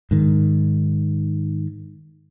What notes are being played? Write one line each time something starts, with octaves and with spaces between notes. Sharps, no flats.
G#2 D#3